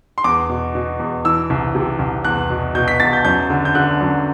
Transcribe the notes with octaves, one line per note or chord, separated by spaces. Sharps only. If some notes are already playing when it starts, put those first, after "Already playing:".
C6
E2 D6
B2
B2
E2
E3 E6
C2
C3
C2
E2 F#6
B2
B2 G6
B6
E2 A6
G6
F#2 G6
D3
G6
D3 F#6
F#2